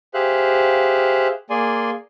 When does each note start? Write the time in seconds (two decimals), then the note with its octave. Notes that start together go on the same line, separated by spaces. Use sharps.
0.14 G4 G#4 C5 E5 F5 F#6
1.50 A#3 G#4 D5 G#5 C6